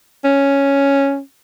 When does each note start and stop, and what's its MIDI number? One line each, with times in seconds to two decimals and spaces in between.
0.24 1.20 61